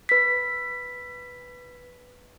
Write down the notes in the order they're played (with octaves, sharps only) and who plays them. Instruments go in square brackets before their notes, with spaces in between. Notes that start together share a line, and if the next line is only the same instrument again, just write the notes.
[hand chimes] B4 B6